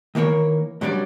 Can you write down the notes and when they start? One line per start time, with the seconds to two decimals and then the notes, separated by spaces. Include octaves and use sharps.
0.15 D#3 E3 A#3 A#4 C#5
0.81 G2 F#3 G3 C#4 A#4 D5